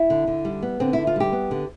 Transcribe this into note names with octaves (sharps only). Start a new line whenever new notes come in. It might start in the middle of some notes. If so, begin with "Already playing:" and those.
Already playing: E4
D3
D3
G3
B3
D3 C4
E4
D3
F4
G3 G4
B3
D3